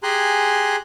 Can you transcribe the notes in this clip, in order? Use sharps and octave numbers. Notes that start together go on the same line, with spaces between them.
G4 G#4 G#5 A#5 C6 F#6